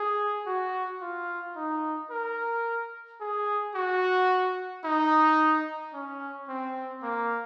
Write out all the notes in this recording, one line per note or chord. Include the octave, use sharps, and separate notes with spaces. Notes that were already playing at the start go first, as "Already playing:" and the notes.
Already playing: G#4
F#4
F4
D#4
A#4
G#4
F#4
D#4
C#4
C4
A#3